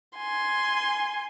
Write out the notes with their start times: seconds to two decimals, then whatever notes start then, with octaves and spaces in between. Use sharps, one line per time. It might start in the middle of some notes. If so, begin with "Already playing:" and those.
0.17 G#5 C6